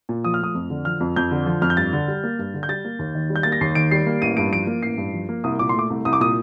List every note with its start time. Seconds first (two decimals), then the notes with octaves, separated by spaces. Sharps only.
0.09 A#2
0.24 F3 D#6
0.34 F6
0.40 A3 D#6
0.55 F2
0.70 D3
0.85 F3 F6
1.00 F2
1.16 F2 G6
1.31 D3
1.46 F3
1.62 F2 F6
1.70 G6
1.77 G2 A6
1.93 D3
2.08 G3
2.24 A#3
2.39 G2
2.54 D3
2.63 G6
2.69 G3 A6
2.85 A#3
2.99 D#2
3.15 D#3
3.30 G3
3.36 G6
3.43 A#3 A6
3.52 A#6
3.61 D#2 C7
3.75 D#3 D7
3.91 G3 C7
4.06 A#3
4.22 A1 D#7
4.37 G2 D7
4.52 F3 D7
4.67 A#3
4.83 A1 C7
4.98 G2
5.13 F3
5.29 A#3
5.44 C2 D#6
5.59 A#2 D6
5.69 C6
5.74 A3 D6
5.90 C2
6.05 C2 D#6
6.13 D6
6.20 A#2 D#6